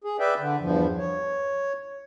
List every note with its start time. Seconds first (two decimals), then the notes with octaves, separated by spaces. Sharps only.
0.04 G#4
0.20 B4 D5 E5 G5
0.39 D3
0.60 E2 G2 F3
0.98 C#5